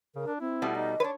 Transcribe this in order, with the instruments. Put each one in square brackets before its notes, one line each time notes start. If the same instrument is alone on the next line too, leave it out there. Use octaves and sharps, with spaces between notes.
[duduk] C#3 [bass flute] A#4
[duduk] D4
[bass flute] C4 [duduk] E4
[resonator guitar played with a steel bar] B2 G3 A3
[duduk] D#4 [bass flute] D#5
[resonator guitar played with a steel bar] D4 B4 [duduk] C#5